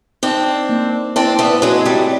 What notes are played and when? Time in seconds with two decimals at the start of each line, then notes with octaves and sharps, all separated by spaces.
0.23 C4 D4 D#4
0.69 A#3
1.16 C4 D4 E4
1.39 A3 B3
1.62 F#3 G#3 C4
1.85 G3 A3